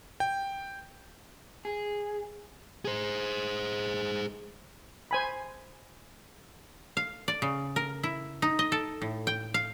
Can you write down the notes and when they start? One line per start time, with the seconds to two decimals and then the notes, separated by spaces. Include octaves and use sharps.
0.20 G5
1.65 G#4
2.85 G#4 C5
5.11 C5 G#5 B5
6.97 F5
7.28 D5
7.42 C#3
7.76 A#4
8.03 E4
8.42 D#4
8.59 D#5
8.72 A4
9.02 A2
9.27 G5
9.54 F5